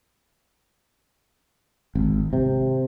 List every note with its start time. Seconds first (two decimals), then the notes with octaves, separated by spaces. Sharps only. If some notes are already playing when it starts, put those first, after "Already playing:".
1.95 G#1
2.33 C3